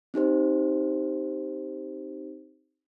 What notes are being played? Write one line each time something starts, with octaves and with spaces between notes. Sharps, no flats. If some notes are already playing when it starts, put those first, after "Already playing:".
C4 D#4 G4 C5